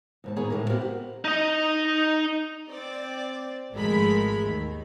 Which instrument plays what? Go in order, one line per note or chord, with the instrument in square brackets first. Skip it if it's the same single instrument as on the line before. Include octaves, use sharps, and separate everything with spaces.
[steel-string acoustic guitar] D#2 G#2 A5
D#3 A#3 B3 G#4 C#5
A2 C#3 F#3 A3 A#3
B3 C4 F#4 G4 F5
F#5
[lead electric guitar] D#4 D#5
[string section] C4 D5
G#1 F3 G#3 A3 A#4 B5
D#2 D#3